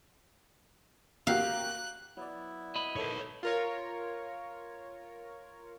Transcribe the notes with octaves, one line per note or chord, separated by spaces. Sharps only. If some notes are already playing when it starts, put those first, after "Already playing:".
A#3 F#4 G4 F5 F#6
F#3 B3 E4 D5
D#5 B5
D#3 A3 A4 B4 C#5
F4 A#4 C#5